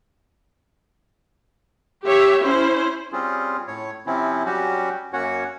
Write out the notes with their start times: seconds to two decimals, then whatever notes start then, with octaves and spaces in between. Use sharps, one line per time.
2.06 G4 C#5 E5
2.42 C#4 E4 C5
3.12 G3 C4 C#4 F4 G#4
3.68 A2 C#5
4.06 C3 F3 C4 C#4 E4
4.46 F#3 G3 C#4 F#4 G4
5.13 F#2 A#3 C#4 F#4 C#5 F#5